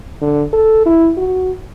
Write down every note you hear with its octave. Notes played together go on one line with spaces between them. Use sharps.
D3
A4
E4
F#4